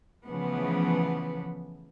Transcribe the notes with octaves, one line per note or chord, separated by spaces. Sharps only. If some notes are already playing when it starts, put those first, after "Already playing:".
C#3 E3 F3 A3 B3